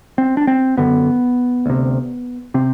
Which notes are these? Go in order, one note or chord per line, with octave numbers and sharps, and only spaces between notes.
C4
D4
C4
F#2 D3 B3
D2 C3
C3 C4